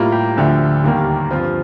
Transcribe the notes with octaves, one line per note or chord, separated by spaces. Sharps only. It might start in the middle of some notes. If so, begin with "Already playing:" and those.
Already playing: A2 G3 A#3 F4
G4
D2 D3 F3 A3
D#2 D#3 G3 A#3
G2 F3 C4 F4